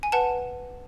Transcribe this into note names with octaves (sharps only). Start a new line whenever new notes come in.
G#5
B4 F#5 A5